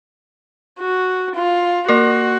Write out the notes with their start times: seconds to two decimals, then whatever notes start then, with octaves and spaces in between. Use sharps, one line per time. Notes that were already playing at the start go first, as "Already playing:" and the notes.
0.79 F#4
1.35 F4
1.88 A#3 F#4 A#4